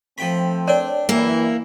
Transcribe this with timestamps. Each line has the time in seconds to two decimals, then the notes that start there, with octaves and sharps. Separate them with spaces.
0.18 F3 A3 C4 G5 B5
0.68 D4 A#4 C#5 D5 G5
1.09 F#2 E3 A#3 E4